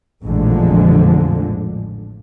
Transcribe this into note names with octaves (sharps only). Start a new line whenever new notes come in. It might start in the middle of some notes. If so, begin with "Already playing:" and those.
A1 F2 A#2 D3 F3 G#3